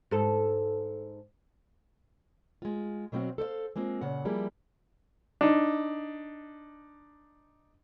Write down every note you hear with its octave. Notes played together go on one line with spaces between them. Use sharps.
G#2 A4
G#3 F4
B2 F#3 C4 F4 F#4 F5
A4 C5 D5 F5
G#3 A#3 C4 F4
A#2 C#3 F#5
F3 G3 A#3 E4 G#4
D4 D#4